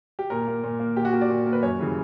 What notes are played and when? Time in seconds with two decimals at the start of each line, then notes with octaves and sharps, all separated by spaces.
0.19 G4
0.30 A#2 A#4
0.47 A#3
0.64 A#2
0.80 A#3
0.97 A#2 G4
1.05 F#4
1.13 A#3 G4
1.21 D5
1.30 A#2
1.46 A#3
1.53 B4
1.62 F#2 C#5
1.80 C#3 E3 G3